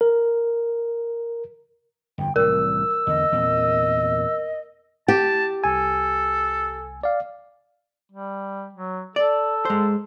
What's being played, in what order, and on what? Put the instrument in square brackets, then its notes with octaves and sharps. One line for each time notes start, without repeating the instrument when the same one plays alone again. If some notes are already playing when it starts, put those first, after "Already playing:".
[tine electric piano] A#4
[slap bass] G1 F2 [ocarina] G5
[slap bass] C2 A2 E3 [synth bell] A#4 [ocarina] E6
[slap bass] E2 D3 [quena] D#5
[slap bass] E2 A#2 C4
[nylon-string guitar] G4 [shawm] A5
[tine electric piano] C2 G#5 [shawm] A4
[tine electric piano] D5 F5
[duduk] G3
F#3
[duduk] A4 [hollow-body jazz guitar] D5
[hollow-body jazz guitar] G#3 C5